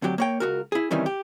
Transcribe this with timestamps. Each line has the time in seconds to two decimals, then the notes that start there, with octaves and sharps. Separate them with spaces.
0.02 D2 C3 F#3 G4
0.18 A#3 C#5 G5
0.40 C#2 F#4 A#4
0.72 E4 G#4
0.91 C3 D#3 E3 G3 C#4
1.06 G4